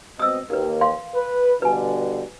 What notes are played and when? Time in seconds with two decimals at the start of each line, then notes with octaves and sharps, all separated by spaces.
0.19 B2 C4 D#5 D#6 E6
0.50 D#2 A#3 A#4 B4
0.81 F5 C6
1.15 B4
1.62 G2 B2 D3 B4 G#5